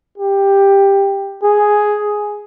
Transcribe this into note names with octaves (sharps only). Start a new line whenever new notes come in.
G4
G#4